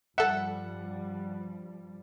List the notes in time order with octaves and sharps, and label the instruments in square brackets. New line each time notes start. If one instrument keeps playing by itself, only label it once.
[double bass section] G2 F3 G3 [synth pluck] A4 E5 [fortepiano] F#5